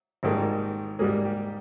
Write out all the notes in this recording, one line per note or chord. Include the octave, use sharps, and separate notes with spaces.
G#1 G#2 D#3 G3 A#3
G#2 G3 A#3 G#4
G4